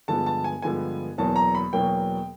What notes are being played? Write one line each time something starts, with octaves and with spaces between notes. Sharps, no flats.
G2 D3 F3 G#3 B3 A5
A5
G#5
G2 D3 F3 G#3 B3 G#5
E2 B2 F#3 A#3 A5
A#5
B5
E2 B2 F#3 A#3 G5